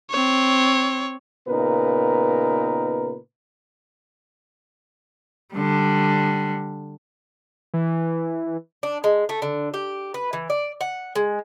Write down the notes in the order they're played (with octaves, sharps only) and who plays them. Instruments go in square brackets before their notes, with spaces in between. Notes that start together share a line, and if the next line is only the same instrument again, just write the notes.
[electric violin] C4 C#5
[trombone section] A#2 C#3 B3 D#4 A#4 B4
[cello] D3 G3
[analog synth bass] E3
[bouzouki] D4
G#3
A3
D3
G4
B4
E3
D5
F#5
G#3